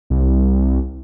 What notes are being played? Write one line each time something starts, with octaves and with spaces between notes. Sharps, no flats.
C2